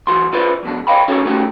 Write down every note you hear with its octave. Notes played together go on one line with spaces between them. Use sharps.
B1 E3 F#4 C6
E4 F4 B4 C5 D5
F2 B2 D4
C#5 D#5 F5 G5 B5
C#4 D#4 F#4 A4 C#5
A3 C#4 D#4 F#4 G4